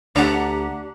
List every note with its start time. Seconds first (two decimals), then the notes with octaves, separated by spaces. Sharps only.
0.16 D2 D4 G4 F#5 A#5